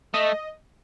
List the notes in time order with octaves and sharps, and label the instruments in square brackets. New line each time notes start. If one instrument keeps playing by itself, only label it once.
[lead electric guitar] A3 [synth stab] D#5